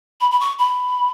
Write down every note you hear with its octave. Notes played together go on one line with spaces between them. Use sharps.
B5
B5
C#6
B5